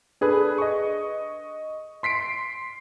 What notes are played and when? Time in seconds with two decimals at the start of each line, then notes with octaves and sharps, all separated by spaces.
0.21 D4 G#4 A4 B4
0.58 D#5 C#6
2.03 C6 B6 C7 D7